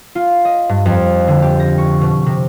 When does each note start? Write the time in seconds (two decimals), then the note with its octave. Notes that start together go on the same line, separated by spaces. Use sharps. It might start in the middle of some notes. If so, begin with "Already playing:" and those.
0.15 F4
0.45 D#5
0.69 G2
0.86 F2
1.27 D3
1.42 G4
1.60 A#6
1.78 C#6
2.01 B2
2.26 C3